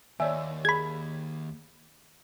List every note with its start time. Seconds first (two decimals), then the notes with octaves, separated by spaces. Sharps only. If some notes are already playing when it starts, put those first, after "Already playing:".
0.20 D#2 C#5 D5 E5 G#5
0.65 G#4 B5 G#6